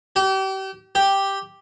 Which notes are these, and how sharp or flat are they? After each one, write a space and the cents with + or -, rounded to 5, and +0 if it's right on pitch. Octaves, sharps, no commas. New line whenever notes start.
G4 -35
G4 +0